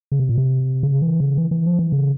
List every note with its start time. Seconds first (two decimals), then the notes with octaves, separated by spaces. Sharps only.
0.12 C#3
0.20 C3
0.29 A#2
0.38 C3
0.83 C#3
1.02 E3
1.20 C#3
1.37 E3
1.51 E3
1.66 F3
1.79 E3
1.92 C#3